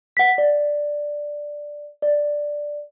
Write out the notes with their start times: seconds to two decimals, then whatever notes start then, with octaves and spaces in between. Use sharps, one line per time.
0.17 F#5 B6
0.38 D5
2.02 D5